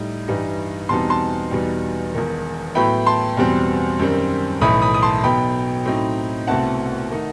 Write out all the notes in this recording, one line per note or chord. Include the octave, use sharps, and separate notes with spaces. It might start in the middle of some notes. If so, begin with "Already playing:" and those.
Already playing: A2 G3 D#4
G2 E3 G3 D#4
E2 B2 G3 C4 D#4 A5 C6
A5 C6
E2 B2 G3 D#4
E1 E2 D#3
A2 F#3 B3 E4 G5 B5
A5 C6
E2 B2 G3 C4
F#2 D#3 G3 C4
B1 A2 E3 A3 E4 B5 D#6
B5 D#6
D#6
A5 C6
B1 B2 F#3 B3 G5 B5
A2 F#3 C4 D#4
C2 B2 A3 C4 E4 F#5 A5
D#3 A3 D#4